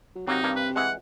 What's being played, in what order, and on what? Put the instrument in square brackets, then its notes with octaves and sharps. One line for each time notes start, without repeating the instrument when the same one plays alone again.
[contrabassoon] F#3
[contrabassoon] C3 [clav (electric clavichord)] F#3 A#3 F#4 [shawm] D#4
[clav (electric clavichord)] G2 A#3
[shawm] B4
[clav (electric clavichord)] E3 G#3 [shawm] F#5